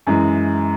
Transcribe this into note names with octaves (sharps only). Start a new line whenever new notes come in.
F#2 E3 G#3